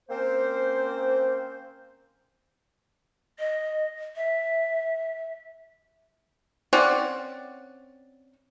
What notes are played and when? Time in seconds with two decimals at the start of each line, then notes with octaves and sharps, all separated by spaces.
0.09 A#3 C4 C#4 C5
3.39 D#5
4.16 E5
6.73 C4 C#4 D5 F#5